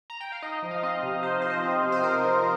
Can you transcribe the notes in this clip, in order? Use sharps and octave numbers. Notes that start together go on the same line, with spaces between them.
A#5
G5
F5
D#4 D#5
F3
F5
C4 D#5
C3
D#4 C5
F3 C5
D#5
C4
C3
C5
D#4 A#4
F3